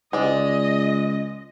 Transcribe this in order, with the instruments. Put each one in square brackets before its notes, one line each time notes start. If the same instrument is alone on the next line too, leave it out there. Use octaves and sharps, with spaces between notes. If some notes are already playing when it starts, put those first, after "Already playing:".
[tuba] C#2 [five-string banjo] G#3 D5 [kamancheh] D#5